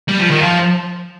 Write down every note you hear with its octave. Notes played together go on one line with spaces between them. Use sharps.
G3
F3
D#3
F3